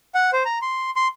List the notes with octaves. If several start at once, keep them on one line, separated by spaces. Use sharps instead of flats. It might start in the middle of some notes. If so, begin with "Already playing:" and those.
F#5
C5
A#5
C6
C6